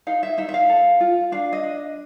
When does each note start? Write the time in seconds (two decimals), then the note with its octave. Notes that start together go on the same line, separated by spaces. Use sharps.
0.07 D#4 F5
0.23 E5
0.38 D#4 E5
0.49 E5
0.54 F5
0.69 A4
1.00 F4
1.32 D4 F5
1.53 D#5
1.63 D4